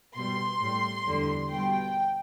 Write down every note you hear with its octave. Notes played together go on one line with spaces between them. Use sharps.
B2 G3 C6
A2 G3
E2 D3 G3
B2 G3 G5